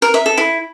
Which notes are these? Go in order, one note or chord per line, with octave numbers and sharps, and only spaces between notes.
A#4
E5
A4
E4